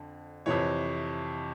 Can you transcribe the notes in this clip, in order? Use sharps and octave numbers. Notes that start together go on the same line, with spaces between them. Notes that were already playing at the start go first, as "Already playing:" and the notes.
Already playing: F2 D3
F2 C3 E3 C#5